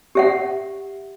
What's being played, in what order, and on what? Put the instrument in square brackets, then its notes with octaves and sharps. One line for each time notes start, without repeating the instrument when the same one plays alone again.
[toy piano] G4 E5 F#5